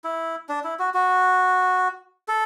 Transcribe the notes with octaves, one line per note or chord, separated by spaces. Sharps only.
E4
D4
E4
F#4
F#4
A4